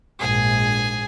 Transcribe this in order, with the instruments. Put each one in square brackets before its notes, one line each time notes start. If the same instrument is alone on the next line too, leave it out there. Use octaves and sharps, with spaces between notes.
[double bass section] A#1 G#2 [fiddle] G#4 G#5